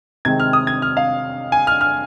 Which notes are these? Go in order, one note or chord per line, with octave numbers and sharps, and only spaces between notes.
C3 D#3 G#3 C4 G#6
F6
D#6
G#6
F6
F5
G#5
F6
F6